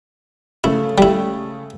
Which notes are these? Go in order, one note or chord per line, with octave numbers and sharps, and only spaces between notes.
C#3 A3 E4
G3 E4